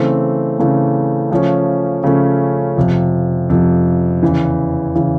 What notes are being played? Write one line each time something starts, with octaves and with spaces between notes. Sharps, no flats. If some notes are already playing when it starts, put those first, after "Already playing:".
Already playing: C#3 E3 A3 C4
C#3 E3 A3 C4
C#3 F3 A3 C#4
C#3 F3 A3 C#4
F2 C3 F3
F2 C3 F3
E2 C#3 E3
C#3 E3